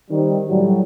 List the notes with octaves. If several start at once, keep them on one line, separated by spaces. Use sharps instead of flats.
D#3 G3 C4
A2 F#3 G3